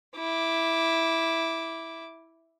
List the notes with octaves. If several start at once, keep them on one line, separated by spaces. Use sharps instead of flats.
E4 D6